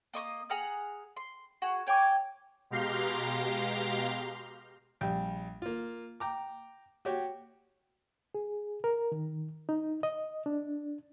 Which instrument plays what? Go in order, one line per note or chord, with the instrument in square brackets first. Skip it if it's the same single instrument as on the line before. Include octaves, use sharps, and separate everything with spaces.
[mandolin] A#3 D#5 C#6 D#6
G#4 F#5 A#5 F6
C6
F#4 G#4
C#5 G5 G#5 D6
[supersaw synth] B2 G#3 G4 F5 A#5 C6
[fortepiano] A#1 G3 G5
A#3 F4
G5 A#5 D6
F#4 G4 C#5 G5
[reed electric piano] G#4
A#4
D#3
D#4
D#5
D4